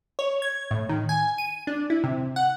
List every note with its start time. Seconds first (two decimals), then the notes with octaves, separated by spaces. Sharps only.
0.19 C#5
0.42 G#6
0.71 A2
0.89 D#3
1.09 G#5
1.38 D#7
1.67 D4
1.90 E4
2.04 C3
2.36 F#5